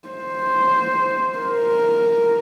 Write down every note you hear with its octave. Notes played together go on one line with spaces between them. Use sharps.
C5
A#4